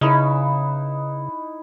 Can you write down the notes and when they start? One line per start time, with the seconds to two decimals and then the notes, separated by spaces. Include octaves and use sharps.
0.01 C#3 D#4 E4 B4